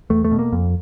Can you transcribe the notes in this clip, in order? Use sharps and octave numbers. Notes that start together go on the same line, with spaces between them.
E2 A3
A3
B2
A#3
F2